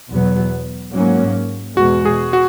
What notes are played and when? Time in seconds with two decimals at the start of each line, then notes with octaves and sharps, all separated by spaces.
0.10 E2 B2 F#3 B3
0.93 G#2 F#3 A#3 C#4
1.77 E2 B2 G#3 F#4
2.05 G#4
2.33 F#4